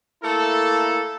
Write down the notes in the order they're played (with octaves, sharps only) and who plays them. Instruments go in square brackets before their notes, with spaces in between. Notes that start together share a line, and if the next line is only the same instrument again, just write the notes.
[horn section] A3 A#3 E4 A4